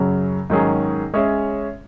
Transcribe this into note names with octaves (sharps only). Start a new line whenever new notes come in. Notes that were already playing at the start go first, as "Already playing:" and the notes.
Already playing: F#2 C#3 F#3
G#2 D#3 F#3 C#4 G#4
G#3 C#4 G#4 C#5 E5